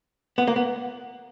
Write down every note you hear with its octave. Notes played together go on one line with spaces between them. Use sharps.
B3
A#3
B3